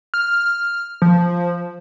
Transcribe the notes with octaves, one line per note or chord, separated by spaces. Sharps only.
F6
F3